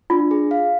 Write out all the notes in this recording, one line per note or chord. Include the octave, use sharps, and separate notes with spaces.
D4 F4
G#4
F5